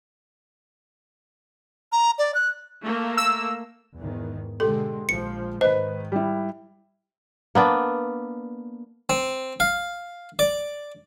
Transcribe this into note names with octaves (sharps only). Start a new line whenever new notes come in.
A#5
D5
F#6
A3 A#3
E6
E2 G#2 D#3
B2 D3 G#3 G4 A4 C6
A#1 F3 G#3 C#7
G#2 D#3 B4 C5 D#5 F#6
G3 E4
A#3 B3 D4
C4
F5
D5